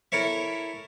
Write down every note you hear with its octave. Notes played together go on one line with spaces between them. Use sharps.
E4 A4 A#4 C#5 E5